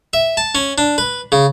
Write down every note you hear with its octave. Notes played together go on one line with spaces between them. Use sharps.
E5
A5
C#4
D4
B4
C#3